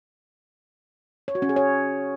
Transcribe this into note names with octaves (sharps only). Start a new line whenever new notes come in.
C#5
F#4
C#4
G#4
C#5